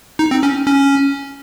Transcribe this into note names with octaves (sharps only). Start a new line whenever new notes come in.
D#4
C4
C#4
C#4